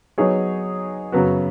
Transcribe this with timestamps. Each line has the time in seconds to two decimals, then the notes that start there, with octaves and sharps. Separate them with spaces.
0.18 F#3 B3 D#4 G#4 C#5
1.12 F#2 C#3 F#3 B3 F#4